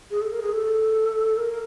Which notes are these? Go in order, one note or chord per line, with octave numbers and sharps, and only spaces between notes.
G#4
A4
A#4
G#4
A4
A#4